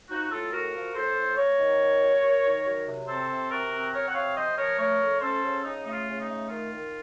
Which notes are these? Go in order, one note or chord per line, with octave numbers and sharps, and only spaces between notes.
F3 D#4 F#4
A2 F4 A4
A2 F#4 A#4
F3
A2 A4 C5
A2
A#3 A#4 C#5
D#3
A#3
F#3
F#3
D#3
F#3
C3
C4 A4 C5
C3
C3 F#4 A#4
C4
C4 A#4 C#5
F#5
C3 C#5 F5
F3 C5 D#5
F3 A#4 C#5
A3 A#4 C#5
A3
C#4 A4 C5
C#3
C#3 D#4
A3 D#4
F4
C#3
D#4
A3
D#3 F4
D#3